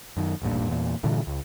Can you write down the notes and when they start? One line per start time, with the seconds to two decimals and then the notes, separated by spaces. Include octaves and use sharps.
0.17 F#2 D#3
0.42 E1 A1 G2 A#2
0.68 E2 A#2
1.03 G2 A#2 D3 E3
1.27 C#2